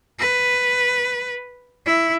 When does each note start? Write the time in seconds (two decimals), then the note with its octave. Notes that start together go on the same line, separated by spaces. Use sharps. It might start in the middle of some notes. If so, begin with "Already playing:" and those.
0.19 B4
1.86 E4